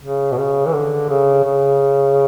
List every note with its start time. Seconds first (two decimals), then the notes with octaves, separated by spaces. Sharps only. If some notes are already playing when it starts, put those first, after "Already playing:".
0.03 C#3
0.32 B2
0.38 C#3
0.66 E3
0.73 D3
1.09 C#3
1.44 C#3